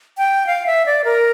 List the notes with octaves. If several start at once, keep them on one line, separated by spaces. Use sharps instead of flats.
G5
F5
E5
D5
A#4